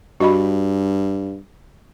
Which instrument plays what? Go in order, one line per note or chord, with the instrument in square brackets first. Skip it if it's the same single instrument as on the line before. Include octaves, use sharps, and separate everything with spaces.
[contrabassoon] G2 [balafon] F#4 D#5 B5